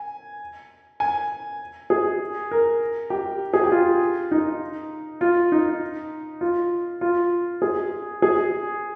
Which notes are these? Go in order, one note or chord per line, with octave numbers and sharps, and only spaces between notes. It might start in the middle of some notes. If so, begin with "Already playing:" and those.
Already playing: G#5
G#5
G#4
A#4
G4
G#4
G4
F4
D#4
F4
D#4
F4
F4
G#4
G#4